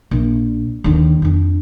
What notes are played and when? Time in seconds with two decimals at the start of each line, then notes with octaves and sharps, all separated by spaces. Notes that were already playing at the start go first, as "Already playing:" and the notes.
0.11 A#1
0.84 D#2 D3
1.22 F2 D4